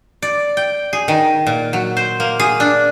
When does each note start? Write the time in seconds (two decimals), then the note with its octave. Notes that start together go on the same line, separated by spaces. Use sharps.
0.22 D5
0.57 G5
0.93 G#4
1.08 D#3
1.47 A#2
1.73 F#3
1.97 C5
2.20 A#3
2.40 G#4
2.60 D4